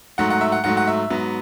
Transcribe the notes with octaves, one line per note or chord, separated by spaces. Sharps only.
G#2 F#3 A3 F#5
F#5
E5
F#5
G#2 F#3 A3 F#5
F#5
E5
G#2 F#3 B3